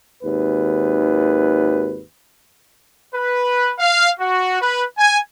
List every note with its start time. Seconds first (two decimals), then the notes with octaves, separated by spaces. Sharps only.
0.23 G#1 D#2 B4
3.14 B4
3.79 F5
4.19 F#4
4.62 B4
4.98 G#5